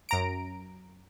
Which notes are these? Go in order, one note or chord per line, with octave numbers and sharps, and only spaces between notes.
F#2 A#5 D7